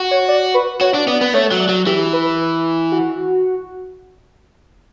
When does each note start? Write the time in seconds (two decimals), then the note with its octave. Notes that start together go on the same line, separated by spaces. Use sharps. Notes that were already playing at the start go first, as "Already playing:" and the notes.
Already playing: F#4
0.11 C#5
0.28 D5
0.54 B4
0.81 F#4 C#5
0.94 D4
1.08 B3 D5
1.21 B3
1.34 A3 C#5
1.51 F#3
1.60 D5
1.69 F#3
1.86 E3 G4
2.13 B4
2.92 F#4